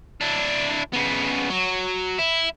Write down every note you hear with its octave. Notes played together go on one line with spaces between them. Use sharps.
D4 E4
C#3 B3
F#3
E4